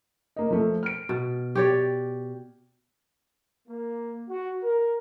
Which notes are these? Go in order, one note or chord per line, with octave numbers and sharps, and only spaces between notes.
A#3 D#5
F3 A3
F6 D7
B2
G4 C#5 D5
A#3
F#4
A#4